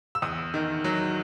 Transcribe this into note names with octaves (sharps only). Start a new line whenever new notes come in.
E6
E2 D#6
D#3
F#3